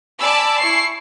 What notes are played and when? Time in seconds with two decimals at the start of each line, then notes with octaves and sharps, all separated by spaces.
0.20 D5 G#5 A5 B5 D6 E6
0.60 E4 C#6 C7